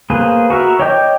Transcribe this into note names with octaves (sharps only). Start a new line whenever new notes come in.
A#3 G#4 B4 C5
F#4 A#4 E5
C#5 D#5 G5 D6 G6